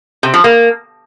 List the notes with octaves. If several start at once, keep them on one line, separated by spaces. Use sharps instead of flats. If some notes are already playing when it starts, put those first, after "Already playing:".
C3
F3
A#3